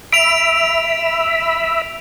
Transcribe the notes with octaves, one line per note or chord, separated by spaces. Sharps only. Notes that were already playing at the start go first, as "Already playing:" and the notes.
E5 B5 D7 F7